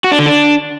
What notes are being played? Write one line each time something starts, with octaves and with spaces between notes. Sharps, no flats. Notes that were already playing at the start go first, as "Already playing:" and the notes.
F#4
D4
D3
D4